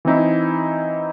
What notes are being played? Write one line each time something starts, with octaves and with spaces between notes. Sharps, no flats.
E3 C4 D#4 E4